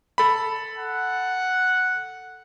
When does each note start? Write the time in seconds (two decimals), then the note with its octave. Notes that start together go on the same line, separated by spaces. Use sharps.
0.18 A4 B5
0.77 F#5